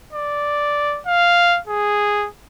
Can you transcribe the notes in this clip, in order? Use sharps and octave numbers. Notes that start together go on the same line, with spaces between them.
D5
F5
G#4